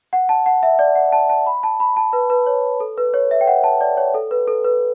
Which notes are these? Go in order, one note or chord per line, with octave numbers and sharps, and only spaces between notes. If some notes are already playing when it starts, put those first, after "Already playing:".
F#5
A5
F#5
E5
D5
F#5
A5
A5
B5
A5
B5
A5
B4
B4
C#5
A4
B4
C#5
E5
G5
F#5
A5
D5
C#5
A4
B4
A4
B4